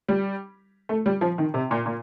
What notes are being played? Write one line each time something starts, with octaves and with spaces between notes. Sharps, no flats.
G3
A3
G3
F3
D#3
C3
A#2
A#2